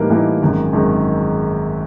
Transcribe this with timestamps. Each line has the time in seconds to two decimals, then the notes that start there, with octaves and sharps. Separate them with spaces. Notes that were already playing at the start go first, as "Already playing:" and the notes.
Already playing: A2 E3 G3 A#3 D#4
0.10 A2 E3 G3 A#3 D#4
0.41 G#1 F#2 D#3 G#3
0.73 G#1 F#2 D#3 G#3